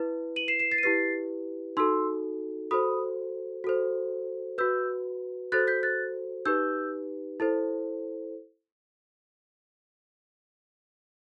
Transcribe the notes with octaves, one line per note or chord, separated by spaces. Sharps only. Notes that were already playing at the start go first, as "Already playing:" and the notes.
Already playing: E4 B4
D#7 F#7
C7 E7
C7 E7
A6 C7
D#7
E4 G4 B4 A6 C7
D#4 F#4 A4 C6 E6
F#4 A4 C5 B5 D#6
F#4 A4 C5
F#4 B4 E6 G6
F#4 A4 C5 F#6 A6
G6 B6
F#6 A6
D#4 G4 B4 E6 G6
E4 A4 C5